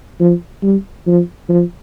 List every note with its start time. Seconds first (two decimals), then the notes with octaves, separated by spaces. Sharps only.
0.20 F3
0.62 G3
1.07 F3
1.49 F3